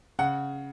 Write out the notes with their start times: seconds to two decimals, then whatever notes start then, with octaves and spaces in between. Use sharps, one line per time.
0.19 C#3 F#5